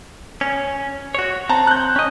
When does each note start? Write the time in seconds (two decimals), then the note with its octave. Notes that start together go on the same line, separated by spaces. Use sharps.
0.41 C#4
1.15 F#4 C#5
1.49 C4 A5 A#5
1.67 F#6 G6
1.96 C#4 D#5